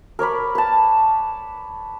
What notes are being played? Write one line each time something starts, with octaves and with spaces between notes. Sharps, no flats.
A#4 C#5 D5 B5
B4 A5